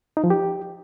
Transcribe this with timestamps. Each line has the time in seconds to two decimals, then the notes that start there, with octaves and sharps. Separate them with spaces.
0.17 D#4
0.24 F3
0.30 G4